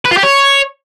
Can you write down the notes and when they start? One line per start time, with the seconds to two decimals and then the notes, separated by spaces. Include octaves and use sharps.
0.06 B4
0.11 F4
0.17 G4
0.23 C#5